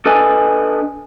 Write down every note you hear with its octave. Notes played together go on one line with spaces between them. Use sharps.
D4 A4 B4 D#5 G#5